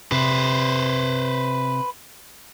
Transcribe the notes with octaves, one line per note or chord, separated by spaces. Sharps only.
C3 B4 C5